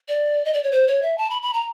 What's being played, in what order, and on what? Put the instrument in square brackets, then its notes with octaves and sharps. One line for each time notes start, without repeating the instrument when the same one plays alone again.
[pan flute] D5
D#5
D5
C#5
C5
C#5
E5
A5
B5
B5
A#5